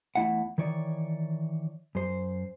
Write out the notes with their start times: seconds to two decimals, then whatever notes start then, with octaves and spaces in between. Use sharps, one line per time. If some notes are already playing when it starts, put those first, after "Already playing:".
0.15 E2 A3 E4 E5 F#5
0.58 D#3 E3 C#5 D5
1.95 F#2 C5